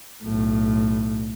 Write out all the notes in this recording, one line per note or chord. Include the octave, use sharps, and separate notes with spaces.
B1 A2